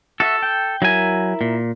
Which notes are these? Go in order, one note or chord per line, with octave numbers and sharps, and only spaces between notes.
F#4 A4 E5
G5
F#3 E4 A#4 E5 G#5
A#2